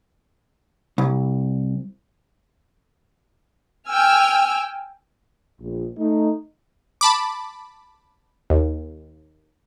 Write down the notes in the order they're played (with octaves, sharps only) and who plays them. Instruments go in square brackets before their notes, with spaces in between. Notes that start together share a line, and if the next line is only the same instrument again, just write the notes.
[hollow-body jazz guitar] C2
[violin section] G5 G#5 E6 F6
[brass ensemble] A#1
A3 D#4
[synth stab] A5 B5 D6
D#2